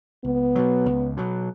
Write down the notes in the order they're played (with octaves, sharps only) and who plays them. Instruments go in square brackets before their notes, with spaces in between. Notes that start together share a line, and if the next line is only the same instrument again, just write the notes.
[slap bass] C#2 [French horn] B3
[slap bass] B2 F#3
C#2
B2 F#3